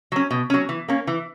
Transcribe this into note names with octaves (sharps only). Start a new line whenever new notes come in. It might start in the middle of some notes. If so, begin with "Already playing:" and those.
F#3 C#4
B2
F#3 C#4
E3
A#3 C#4
E3